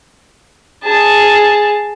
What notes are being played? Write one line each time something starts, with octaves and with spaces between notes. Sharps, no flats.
G#4 A5